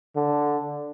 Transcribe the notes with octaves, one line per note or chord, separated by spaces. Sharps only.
D3